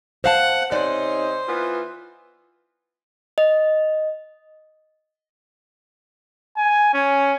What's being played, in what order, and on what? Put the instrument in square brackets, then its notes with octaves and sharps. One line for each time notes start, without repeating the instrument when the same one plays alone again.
[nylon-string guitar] C5 F5 A5 [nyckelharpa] F#5
[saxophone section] C3 C#4 D#4 [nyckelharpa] C5 [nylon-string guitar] D5
[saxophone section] E3 B3 F4
[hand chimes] D#5
[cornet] G#5
C#4